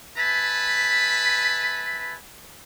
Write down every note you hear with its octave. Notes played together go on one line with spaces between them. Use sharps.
B4 E5 G#5 A5 B5